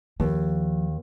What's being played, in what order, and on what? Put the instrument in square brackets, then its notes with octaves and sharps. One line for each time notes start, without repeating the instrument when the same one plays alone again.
[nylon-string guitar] D#2 [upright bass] F3